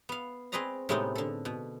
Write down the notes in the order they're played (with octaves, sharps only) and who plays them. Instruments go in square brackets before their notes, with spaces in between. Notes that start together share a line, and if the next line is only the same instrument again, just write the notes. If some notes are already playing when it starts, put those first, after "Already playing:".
[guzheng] B3 F5
C4 G#4 B4 D5 D#5 A#5
A2 C3 G#3 B3 C4 D#4
D3 A4
B2